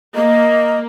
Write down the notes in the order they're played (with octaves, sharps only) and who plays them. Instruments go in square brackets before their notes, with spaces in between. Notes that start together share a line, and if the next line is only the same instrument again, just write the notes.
[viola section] A#3 [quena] D#5